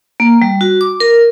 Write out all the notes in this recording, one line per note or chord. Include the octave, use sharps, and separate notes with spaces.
A#3
G3
F#4
D6
A#4